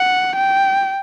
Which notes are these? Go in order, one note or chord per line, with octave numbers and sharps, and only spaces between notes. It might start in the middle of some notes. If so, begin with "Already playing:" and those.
Already playing: F#5
G5